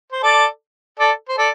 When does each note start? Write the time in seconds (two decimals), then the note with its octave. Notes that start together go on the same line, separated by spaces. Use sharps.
0.12 C5
0.23 A4 D5
1.00 A4 D5
1.29 C5
1.38 A4 D5